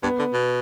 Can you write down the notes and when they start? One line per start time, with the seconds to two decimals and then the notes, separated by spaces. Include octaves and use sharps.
0.03 G2 B3
0.19 D3
0.33 B2